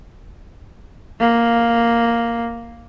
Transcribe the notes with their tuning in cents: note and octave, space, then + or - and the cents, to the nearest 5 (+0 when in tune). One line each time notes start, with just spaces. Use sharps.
A#3 +0